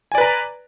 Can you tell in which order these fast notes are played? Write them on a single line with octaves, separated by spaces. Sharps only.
G#5 D5 B4 A#5